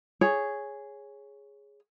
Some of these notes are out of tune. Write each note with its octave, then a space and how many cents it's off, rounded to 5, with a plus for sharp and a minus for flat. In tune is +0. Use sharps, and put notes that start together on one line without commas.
G#4 +0 C#5 +0